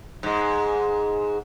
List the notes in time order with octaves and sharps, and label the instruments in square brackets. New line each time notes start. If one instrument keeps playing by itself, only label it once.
[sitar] G#2 G#3